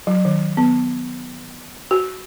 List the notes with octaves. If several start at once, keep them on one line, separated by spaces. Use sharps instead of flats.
F#3
D#3
B3
F#4